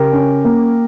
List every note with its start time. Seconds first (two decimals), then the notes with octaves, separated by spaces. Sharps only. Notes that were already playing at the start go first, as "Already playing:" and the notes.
Already playing: C#3 G4 A#4
0.12 C#4
0.45 A#3